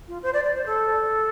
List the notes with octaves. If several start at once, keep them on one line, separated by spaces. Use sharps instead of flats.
F4
C5
D5
D5
C5
A4